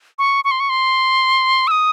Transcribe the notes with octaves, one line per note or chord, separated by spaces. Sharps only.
C#6
C#6
C6
C#6
C6
E6
D#6